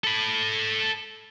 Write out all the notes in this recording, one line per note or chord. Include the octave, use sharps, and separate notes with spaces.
A4 B5